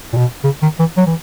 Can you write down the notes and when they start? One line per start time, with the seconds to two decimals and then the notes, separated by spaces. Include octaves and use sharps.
0.13 A#2
0.17 B2
0.44 C#3
0.62 D#3
0.79 E3
0.97 F#3
1.06 E3